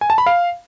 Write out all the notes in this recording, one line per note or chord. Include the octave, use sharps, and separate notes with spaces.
G#5
A5
B5
F5